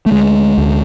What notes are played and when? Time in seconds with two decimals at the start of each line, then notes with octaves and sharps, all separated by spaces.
0.06 A3
0.11 D2 G#3
0.58 D2